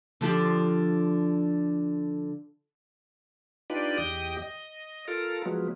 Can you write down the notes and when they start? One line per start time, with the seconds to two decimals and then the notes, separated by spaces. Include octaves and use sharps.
0.21 D3 F3 G4
3.70 D4 D#4 F4 G4 B4 D5
3.98 E2 G4 D#5 G5 D#6
4.42 D#5
5.08 F4 A4 A#4
5.45 F3 F#3 G#3 B3